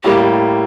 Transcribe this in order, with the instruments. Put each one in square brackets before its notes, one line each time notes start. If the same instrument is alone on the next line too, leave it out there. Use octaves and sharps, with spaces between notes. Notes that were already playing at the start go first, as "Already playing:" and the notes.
[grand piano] A2 G3 A#3 [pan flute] G4